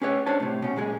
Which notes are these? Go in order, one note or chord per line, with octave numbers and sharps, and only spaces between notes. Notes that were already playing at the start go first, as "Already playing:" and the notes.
C#4 G#4 B4 C#5
D4 C5 C#5 A5
A2 C3
B2 C#4
A#2 G#3 G#4